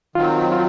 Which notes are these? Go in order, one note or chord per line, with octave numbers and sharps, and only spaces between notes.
D#3 F#3 C4 F4
F4